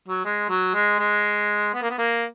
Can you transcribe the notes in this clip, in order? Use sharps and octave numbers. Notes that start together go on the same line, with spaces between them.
F#3
G#3
F#3
G#3
G#3
B3
A#3
B3
A#3